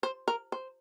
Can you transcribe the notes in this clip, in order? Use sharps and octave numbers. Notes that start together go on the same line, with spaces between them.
C5
A#4
C5